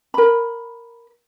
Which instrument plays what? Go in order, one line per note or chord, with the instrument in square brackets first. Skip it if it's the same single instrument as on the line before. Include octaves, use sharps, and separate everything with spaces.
[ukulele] A#4 B5